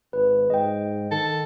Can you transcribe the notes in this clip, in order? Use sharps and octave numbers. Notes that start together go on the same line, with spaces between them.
G#1 B4
G#2 D#5 G5
D#3 A4